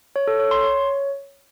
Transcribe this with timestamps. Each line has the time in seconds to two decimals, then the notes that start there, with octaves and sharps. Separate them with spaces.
0.16 C#5
0.27 A4
0.39 C#5
0.51 C6
0.63 C#5